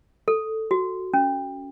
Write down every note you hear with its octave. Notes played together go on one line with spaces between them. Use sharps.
A4
F#4
C#4